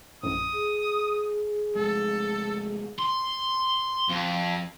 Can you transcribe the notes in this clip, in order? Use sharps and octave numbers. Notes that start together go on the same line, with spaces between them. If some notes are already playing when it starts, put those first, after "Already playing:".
A#1 F#2 A2 D#6
G#4
F1 G#3 A4
C6
F2